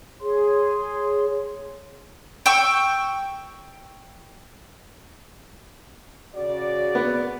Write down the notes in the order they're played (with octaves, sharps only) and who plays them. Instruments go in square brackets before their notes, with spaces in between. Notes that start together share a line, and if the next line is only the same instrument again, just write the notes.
[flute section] G#4 C#5 C6
[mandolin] G5 C#6 E6
[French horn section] C#3 F#4 D5
[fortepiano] B3